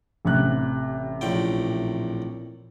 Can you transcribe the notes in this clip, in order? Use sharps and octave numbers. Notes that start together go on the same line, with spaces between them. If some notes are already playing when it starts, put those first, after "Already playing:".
A1 C3 F#6
A#1 A2 G5